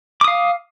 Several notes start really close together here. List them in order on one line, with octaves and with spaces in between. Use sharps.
D6 D#6 F5